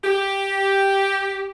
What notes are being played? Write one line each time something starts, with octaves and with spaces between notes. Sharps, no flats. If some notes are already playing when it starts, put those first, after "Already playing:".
G4